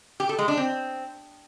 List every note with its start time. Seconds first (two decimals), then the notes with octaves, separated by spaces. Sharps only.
0.20 G4
0.29 A4
0.39 G#3
0.48 D4
0.57 C4